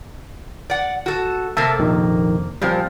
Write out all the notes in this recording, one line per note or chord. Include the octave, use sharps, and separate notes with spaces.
D5 F#5
F#4 A4
C3 A#3 A4 E5 A5
A#1 F2 D#3
A#2 F3 G3 C4